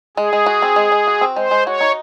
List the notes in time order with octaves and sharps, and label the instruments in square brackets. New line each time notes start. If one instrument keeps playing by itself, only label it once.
[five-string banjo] G#3 [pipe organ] G#4
[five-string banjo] G#3
F#4
C4
G#3
G#3
F#4
C4
[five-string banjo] G#3 [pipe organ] C5
[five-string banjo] G#3
[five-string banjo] F#4 [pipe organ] C#5
[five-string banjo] D#4